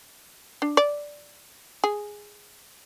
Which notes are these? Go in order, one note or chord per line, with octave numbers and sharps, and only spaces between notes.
D4
D5
G#4